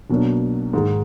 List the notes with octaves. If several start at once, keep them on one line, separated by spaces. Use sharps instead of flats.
B1 B2 F#3 A#3 D4
G#2 D#3 G#3